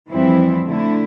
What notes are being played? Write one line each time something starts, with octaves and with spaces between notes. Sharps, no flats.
F2 E3 G3 C4 E4
D3 A3 E4